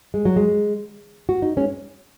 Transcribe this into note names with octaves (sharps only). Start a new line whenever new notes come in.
G#3
F#3
G#3
F#4
D#4
G#3 C#4